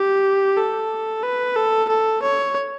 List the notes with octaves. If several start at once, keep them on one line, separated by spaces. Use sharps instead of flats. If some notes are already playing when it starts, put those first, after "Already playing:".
Already playing: G4
A4
B4
A4
A4
C#5